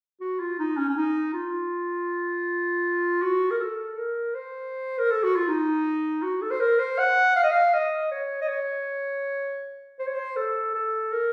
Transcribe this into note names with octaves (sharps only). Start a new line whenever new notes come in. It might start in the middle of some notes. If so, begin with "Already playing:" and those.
F#4
F4
D#4
C#4
C#4
D#4
F4
F#4
A#4
A4
A#4
C5
A#4
A4
F#4
F4
D#4
F#4
A4
C5
A#4
C5
F#5
F5
D#5
F5
D#5
C#5
D#5
C#5
C5
C#5
C5
A4
A4
A#4